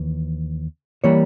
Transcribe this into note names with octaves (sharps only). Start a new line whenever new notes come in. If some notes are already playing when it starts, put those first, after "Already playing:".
Already playing: D#2 E3
E3 G3 A#3 C#5